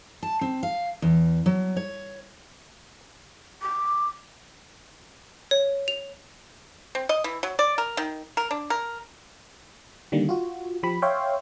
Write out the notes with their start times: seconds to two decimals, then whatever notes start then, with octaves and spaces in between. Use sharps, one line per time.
0.23 A5
0.41 C4
0.63 F5
1.02 E2
1.46 F#3
1.77 C#5
3.61 D6
5.51 C#5
5.88 F7
6.95 C4
7.09 D#5
7.24 E3
7.43 F#3
7.59 D5
7.78 A#4
7.97 D#3
8.37 A#4
8.51 D4
8.70 A#4
10.12 D3 D#3 G3 A#3
10.29 F4 F#4
10.83 F3 G4 B5
11.02 C#5 E5 F5 G5 C6